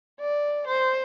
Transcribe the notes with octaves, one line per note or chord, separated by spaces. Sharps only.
D5
C5